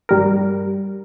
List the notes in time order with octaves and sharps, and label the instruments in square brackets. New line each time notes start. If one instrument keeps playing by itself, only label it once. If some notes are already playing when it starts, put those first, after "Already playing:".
[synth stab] G2 G3 A#4